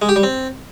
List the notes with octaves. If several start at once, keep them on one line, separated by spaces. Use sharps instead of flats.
G#3
G4
G3
C4